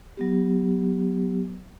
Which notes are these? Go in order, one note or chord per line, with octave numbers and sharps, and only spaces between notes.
F#3 B3 G4